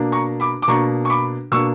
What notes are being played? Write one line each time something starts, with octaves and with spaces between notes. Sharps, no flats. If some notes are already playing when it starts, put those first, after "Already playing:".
Already playing: B2 A#3 D4
A#5 C#6
B5 D6
D6
B2 A#3 D4 A#5 C#6
C#6
B5 D6
B2 A#3 D4 C#6 E6